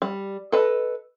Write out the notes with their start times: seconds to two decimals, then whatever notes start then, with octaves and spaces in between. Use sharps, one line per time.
0.02 G3
0.52 A4 B4 D#5